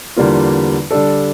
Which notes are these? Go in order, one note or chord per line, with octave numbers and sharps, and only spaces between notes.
E2 D3 G3 A#3 F4
D3 G3 D4 A4